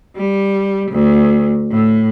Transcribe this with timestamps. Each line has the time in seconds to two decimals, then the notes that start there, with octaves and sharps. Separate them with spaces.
0.15 G3
0.90 D2
1.70 A2